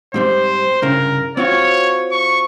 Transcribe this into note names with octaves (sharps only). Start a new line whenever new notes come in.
G#2 G3 C4 C5
C2 G2 C#3 A#4
C4 F4 F#4 C#5
C#6